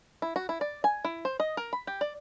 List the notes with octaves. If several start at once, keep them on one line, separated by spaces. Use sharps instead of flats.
E4
F#4
E4
D5
G#5
E4
C5
D#5
A#4
B5
G4
D5